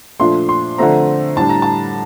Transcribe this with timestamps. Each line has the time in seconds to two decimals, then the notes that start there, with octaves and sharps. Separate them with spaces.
0.20 A#2 F3 A3 D4 C6
0.49 C6
0.78 D3 F3 A3 C4 A#5
1.36 A2 G3 D4 A5
1.49 A#5
1.62 A5